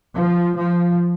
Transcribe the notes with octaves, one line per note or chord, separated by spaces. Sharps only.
F3
F3